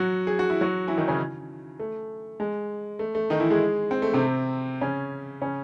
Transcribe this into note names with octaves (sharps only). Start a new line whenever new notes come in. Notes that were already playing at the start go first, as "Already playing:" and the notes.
Already playing: F#3 F#4
G#4
F#4
E4
F#3 F#4
E3 E4
D#3 D#4
C#3 C#4
A3
G#3
A3
A3
D#3 D#4
E3 E4
G#3 G#4
C4
A3
C3 C4
C#3 C#4
C#3 C#4